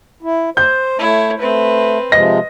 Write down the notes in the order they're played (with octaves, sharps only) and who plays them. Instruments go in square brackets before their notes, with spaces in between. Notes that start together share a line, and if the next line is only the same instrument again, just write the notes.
[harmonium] E4
[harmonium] C5 [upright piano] G6
[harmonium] A3 [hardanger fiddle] E4 C#5
[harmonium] A3 [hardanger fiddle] C4 B4
[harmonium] C3 F3 G#3 [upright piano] D#5 A#6